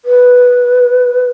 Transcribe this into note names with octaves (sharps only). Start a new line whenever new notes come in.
B4